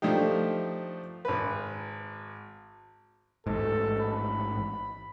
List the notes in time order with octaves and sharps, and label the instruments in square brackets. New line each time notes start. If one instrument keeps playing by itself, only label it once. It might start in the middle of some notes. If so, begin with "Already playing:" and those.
[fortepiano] F3 A3 D4 D#4 G4
G#1 B4
[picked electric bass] A1 G#2 [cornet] A4
[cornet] B5